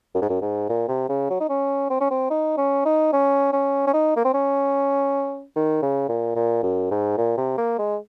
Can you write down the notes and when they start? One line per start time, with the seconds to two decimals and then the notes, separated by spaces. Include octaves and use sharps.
0.15 F#2
0.22 G#2
0.29 F#2
0.42 G#2
0.69 A#2
0.88 C3
1.09 C#3
1.30 F#3
1.40 D#4
1.49 C#4
1.90 C4
2.00 C#4
2.11 C4
2.31 D#4
2.58 C#4
2.85 D#4
3.13 C#4
3.53 C#4
3.87 C#4
3.93 D#4
4.17 A#3
4.25 C4
4.34 C#4
5.56 D#3
5.82 C#3
6.09 A#2
6.36 A#2
6.63 F#2
6.91 G#2
7.18 A#2
7.37 C3
7.58 A#3
7.78 G#3